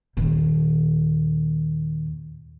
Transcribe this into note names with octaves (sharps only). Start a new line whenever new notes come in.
D#2 A#2